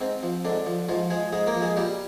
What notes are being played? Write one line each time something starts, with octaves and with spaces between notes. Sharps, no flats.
G#2 C4
F3
G#2 D3 D4
F3
G#2 F3 F4
F3 G#3 G#4
G#2 G#3 G#4
A#3 A#4
F3
G#3 G#4
A#2 G3 G4